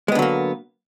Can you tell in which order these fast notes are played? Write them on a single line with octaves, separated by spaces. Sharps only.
G#3 B3 D3 F#3 A#3